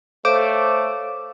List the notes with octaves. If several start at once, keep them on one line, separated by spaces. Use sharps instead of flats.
A3 A4 C5 C#5 F5 D6